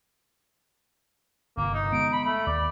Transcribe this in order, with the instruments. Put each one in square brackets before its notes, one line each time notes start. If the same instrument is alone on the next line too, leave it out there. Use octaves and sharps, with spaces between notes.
[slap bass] G1 C3 [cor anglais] A#3
[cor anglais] D#4
[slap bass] G#3 B3 [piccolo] D7
[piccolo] B5
[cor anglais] A3 [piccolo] B5
[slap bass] D#2 [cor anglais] D5